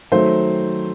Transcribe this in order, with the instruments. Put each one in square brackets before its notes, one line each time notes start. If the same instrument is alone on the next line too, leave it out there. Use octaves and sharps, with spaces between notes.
[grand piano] D#3 F#3 A3 C5